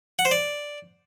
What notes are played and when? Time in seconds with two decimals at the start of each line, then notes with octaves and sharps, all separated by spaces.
0.19 F#5
0.25 C5
0.31 D5